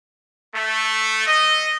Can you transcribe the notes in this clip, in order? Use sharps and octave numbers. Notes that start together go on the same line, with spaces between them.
A3
D#5